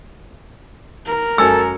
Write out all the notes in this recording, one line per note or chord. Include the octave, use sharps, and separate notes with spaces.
A#4
F#2 A4 G#5 E6 C#7